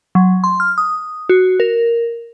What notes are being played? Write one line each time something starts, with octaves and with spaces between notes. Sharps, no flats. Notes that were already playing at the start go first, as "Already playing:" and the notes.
F#3
C6
F6
D#6
F#4
A#4